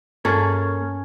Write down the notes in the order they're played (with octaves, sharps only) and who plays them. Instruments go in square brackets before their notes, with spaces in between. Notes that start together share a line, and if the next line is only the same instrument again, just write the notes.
[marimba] G2 [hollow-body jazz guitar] A#3 G#4 A4 [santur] C#4